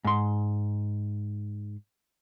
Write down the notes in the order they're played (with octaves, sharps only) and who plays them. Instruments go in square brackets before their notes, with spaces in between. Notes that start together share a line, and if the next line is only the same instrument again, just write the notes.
[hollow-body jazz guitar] G#2 C6